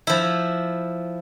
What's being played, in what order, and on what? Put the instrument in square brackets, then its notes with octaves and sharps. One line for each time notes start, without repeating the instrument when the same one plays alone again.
[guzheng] F3 E4